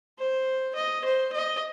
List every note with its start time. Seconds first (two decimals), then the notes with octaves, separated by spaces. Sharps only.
0.18 C5
0.75 D#5
1.05 C5
1.33 D#5